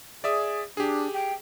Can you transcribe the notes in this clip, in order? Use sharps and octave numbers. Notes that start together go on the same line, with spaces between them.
G#4 D5 E5 D#6
D4 G4 G#4
G5